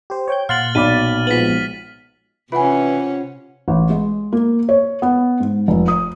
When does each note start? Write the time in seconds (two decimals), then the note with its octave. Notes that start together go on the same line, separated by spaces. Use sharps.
0.10 G4 C5
0.28 C#5 G5 G6
0.49 A#2 F5 F#5 C6 F6 A6 F#7
0.75 B1 D5 B5 A6 D#7
1.27 F3 G#3 B3 B6 F#7
2.52 C3 E3 C#4 F4 F#5 G#5 B5
3.68 A1
3.90 G#3
4.33 A#3
4.69 C#5
5.02 B3
5.40 G#2
5.68 F1
5.88 D#6